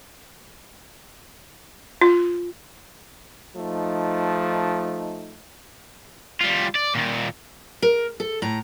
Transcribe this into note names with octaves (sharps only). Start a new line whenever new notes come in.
F4
F3 A3 D#4
G3 F4
D5
A#2 D#3
A#4
A4
A2 A#5